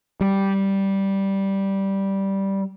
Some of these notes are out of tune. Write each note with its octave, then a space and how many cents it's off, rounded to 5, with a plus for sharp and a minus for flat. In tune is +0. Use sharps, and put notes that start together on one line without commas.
G3 -5